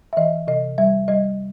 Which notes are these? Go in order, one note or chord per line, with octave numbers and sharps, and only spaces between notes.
E5
E3 D#5
C3 D#5
G3 E5
G3 D#5